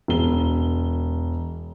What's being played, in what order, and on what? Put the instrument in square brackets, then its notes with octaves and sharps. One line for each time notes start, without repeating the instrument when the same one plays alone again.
[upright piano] E1 G7